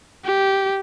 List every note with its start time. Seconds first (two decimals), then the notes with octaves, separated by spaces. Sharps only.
0.25 G4